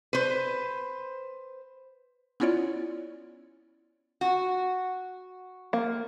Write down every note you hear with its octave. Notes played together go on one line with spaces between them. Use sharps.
B4 C5
B3 C#4 E4 F4 C#5 D5
F#4
A#3